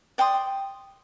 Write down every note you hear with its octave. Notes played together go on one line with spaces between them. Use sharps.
D5 G5 C6 D#6